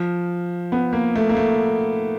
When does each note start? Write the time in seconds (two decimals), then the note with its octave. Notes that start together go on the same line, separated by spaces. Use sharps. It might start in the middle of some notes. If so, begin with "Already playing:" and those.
Already playing: F3
0.72 B3
0.93 A#3
1.16 A3
1.29 A#3
1.37 A3